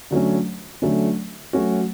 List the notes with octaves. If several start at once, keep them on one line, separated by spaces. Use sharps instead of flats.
D3 F#3 A3 C#4
D3 F#3 A3 C#4
F#3 A3 C#4 F#4